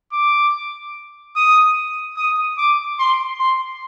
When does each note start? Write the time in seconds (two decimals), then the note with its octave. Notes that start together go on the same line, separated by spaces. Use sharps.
0.13 D6
1.36 D#6
2.17 D#6
2.58 D6
2.99 C6
3.40 C6